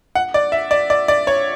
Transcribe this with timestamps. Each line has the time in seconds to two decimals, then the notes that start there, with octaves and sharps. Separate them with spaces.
0.15 F#5
0.34 D5
0.52 E5
0.71 D5
0.90 D5
1.08 D5
1.27 C#5